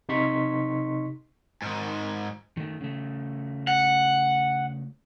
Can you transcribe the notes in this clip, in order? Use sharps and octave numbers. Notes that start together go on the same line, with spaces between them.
C3 D#4 C6 C#6 B6
G#2 D#3
D#3 A3
C#3 A3
F#5